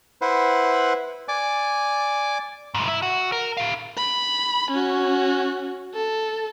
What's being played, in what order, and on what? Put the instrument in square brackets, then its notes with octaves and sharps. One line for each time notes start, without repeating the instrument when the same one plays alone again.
[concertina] E4 B4 C5 F#5
D5 G#5 D6
[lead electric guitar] C2 G#2
E4
F#4
A#4
E4 F5
[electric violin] B5
C#4 F#4
A4